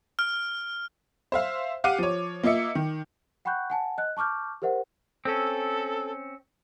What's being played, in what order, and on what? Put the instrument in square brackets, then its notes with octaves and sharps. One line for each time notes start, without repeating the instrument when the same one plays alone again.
[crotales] F6
[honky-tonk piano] C5 E5 F5
G4 F5 F#5 D6 D#7
F3 C#5
A#3 F4 D#5 E5 C#7
D#3
[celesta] F#5 G5 B5 C#6 F#6 G6
F#5 G#5 A5
D#5 F#6
A5 C#6 D6 F6 G6
G4 A#4 C5 E5 F#5
[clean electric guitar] C4 C#4 [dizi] A4